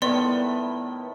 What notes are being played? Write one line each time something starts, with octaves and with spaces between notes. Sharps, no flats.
A2 D#3 G3 B3 D5 C6